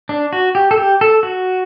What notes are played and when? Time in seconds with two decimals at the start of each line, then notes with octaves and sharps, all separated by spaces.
0.09 D4
0.33 F#4
0.55 G4
0.71 A4
0.78 G4
1.01 A4
1.23 F#4